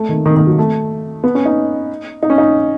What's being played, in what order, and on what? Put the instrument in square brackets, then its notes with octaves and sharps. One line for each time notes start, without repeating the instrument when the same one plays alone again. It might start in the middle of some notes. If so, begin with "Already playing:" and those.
Already playing: [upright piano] A3
D#3
D#3
D#3
F#3
A3
B3
C#4
D#4
D#4
C#4
D#4